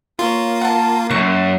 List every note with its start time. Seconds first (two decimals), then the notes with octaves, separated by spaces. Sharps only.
0.19 A#3 F4 C#5 C6
0.61 F#5 A5
1.11 C#2 F#2 C#6